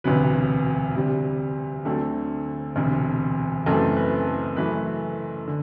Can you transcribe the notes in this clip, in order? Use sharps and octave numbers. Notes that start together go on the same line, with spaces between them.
E1 D2 C3 F#3 B4
D2 C3 G3
D2 D3 F#3 A3 C4 A4
E1 D2 C3
F#1 F#2 E3 A3 C4 A4
B4
A4
F#1 F#2 E3 A3 B4
D3